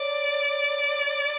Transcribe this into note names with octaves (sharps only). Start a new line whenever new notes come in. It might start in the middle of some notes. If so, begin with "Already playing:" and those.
Already playing: C#5 D5